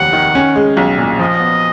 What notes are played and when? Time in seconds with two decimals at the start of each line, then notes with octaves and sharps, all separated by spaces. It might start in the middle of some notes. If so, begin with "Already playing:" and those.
Already playing: F1 D#2 F#3 F#5
0.13 D#3
0.35 C#4
0.56 G#3
0.77 B1
0.98 A#2
1.19 F3 D#5
1.40 B3